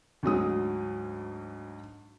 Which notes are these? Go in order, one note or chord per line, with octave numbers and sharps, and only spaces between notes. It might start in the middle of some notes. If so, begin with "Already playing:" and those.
D2 G#2 F#3 D#6